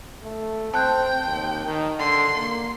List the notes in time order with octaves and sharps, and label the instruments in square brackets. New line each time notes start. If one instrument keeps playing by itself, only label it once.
[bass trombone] A3
[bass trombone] C4 [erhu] G5 [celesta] A5 F#6 G6
[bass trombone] D#2
D#3
[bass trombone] D3 [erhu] C6
[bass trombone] A#3